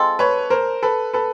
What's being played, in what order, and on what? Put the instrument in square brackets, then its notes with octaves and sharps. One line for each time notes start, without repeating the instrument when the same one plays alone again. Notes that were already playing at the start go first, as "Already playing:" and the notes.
Already playing: [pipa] G#3 C4 F4 A4
[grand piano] B4 C#5
A#4 C5
A4 B4
A4 B4